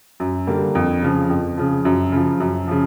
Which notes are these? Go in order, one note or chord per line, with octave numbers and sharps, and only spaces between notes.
F#2
D3 G3 A#3
F2
C#3 F3
F2
C#3 F3
F#2
C#3 F3
F#2
C#3 F3